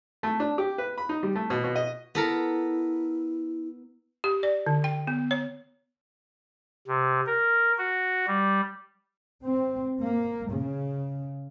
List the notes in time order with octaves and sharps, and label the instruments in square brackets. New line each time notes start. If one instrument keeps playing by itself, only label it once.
[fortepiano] A3
D4
G4
B4
B5
D#4
G3
A3
B2
B2
D#5
[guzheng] B3 A4 A#4 [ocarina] E4
[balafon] G4
D5
D3
G5
B3
C#5
[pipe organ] C3
A#4
F#4
G3
[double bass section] C4
A#3
C#3